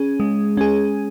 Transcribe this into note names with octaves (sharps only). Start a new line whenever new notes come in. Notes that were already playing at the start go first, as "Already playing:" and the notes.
Already playing: C#4 G#4
G#3
C#4 G#4